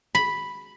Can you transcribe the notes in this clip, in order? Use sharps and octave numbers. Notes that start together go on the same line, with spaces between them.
B5